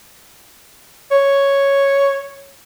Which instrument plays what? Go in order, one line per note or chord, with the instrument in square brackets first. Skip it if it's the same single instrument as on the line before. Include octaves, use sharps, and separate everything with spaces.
[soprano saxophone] C#5